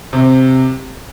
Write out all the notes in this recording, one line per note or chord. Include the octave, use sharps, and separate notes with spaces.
C3